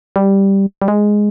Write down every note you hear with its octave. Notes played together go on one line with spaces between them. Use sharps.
G3
G3
G#3